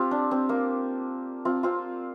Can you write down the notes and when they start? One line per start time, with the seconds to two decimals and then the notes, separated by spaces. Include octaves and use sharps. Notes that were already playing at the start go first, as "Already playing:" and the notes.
Already playing: C4 F4 G4
0.11 D4
0.31 C4
0.49 A#3
1.45 C4 F4
1.63 C4 F4